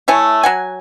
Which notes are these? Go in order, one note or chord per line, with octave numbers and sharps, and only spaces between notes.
A3 E4 C#5 G#5
F#3 F#5 G#5